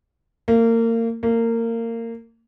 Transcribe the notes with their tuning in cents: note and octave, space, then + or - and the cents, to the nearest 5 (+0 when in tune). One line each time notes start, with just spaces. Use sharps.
A#3 -30
A#3 -25